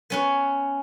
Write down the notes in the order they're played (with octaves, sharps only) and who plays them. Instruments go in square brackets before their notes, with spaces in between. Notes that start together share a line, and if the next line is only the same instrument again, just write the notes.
[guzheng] B3 C#4 F#5